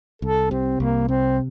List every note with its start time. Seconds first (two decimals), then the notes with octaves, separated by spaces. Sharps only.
0.22 C2 A4
0.51 C3 C4
0.80 C2 A#3
1.08 C3 C4